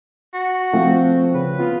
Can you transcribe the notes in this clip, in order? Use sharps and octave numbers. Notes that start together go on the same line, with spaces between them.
F#4
F3 A3 C4
C#3 B4
B3 F4